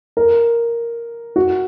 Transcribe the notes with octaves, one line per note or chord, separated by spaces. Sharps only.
A#4
F#4